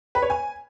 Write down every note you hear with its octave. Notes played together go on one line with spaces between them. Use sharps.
B4
C#5
G#5